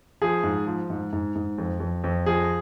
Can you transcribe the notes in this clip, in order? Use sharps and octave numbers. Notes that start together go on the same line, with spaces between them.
F3 G#4
G#2
F3
G#2
G#2
G#2
F2
F2
F2
F3 G#4